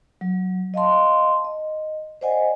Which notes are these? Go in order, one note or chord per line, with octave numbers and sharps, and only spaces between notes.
F#3
D#5 F5 A5 C6
D#5
C5 D5 D#5 F#5 G#5